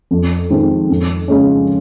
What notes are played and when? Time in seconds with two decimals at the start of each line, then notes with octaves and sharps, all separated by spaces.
0.11 F2
0.50 D#3 G#3 C4
0.90 F2
1.28 C#3 G#3 C#4